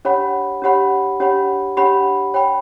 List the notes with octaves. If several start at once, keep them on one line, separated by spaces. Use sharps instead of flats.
D4 G4 C#5 F#5 B5
D4 G4 C#5 F#5 B5
D4 G4 C#5 F#5 B5
D4 G4 C#5 F#5 B5
C#5 G5 B5